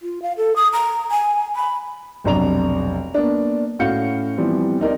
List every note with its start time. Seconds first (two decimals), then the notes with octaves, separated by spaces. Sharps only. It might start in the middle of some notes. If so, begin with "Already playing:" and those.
0.02 F4
0.22 F5
0.37 A4
0.56 D#6
0.73 A#5
1.11 G#5
1.56 B5
2.24 F1 B1 C3 D4 A#5 F7
3.14 A#3 B3 D4
3.79 A2 C#4 F#4 F5 G6 C#7
4.37 E3 F3 G3 B3 C4
4.80 C4 D#4 A#4 D5